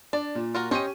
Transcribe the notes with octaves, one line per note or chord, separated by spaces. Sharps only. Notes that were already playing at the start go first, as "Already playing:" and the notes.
D4 D5
A#2
F4 F#4 A#4
C#4 G4 C5 C#5 D#5 D#7